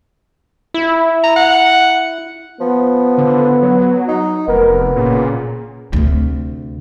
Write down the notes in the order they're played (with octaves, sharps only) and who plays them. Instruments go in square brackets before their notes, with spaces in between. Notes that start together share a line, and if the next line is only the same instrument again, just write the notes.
[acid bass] E4
[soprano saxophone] A#5
F#5
[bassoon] F3 [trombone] B3
[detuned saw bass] D3
F#3
[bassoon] D#4
[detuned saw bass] F1 [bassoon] B3 [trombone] A#4
[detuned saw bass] A#2 [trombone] C#3
[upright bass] D2 C3